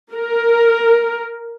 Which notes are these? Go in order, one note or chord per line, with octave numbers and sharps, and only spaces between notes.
A#4